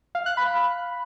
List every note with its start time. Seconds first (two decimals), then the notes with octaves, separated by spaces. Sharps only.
0.15 F5
0.26 F#6
0.37 B5